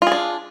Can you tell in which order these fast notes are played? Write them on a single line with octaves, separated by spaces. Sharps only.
F4 G#4 D4